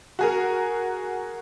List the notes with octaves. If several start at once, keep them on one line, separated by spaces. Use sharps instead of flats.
F#4 G#4 A#4